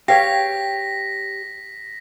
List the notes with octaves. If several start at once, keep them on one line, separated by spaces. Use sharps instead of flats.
G4 G#4 B4 C#5 F5 G5 A#6 B6